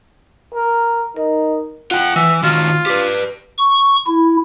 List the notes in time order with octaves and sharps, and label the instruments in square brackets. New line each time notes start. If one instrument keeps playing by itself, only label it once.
[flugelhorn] A#4
[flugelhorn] D#4 [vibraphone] A#4
[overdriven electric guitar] F4 G5 [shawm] F#5
[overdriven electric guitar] E3 [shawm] E5
[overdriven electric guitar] D#3 F#4 [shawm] F4
[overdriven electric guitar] G4 B4
[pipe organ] C#6
E4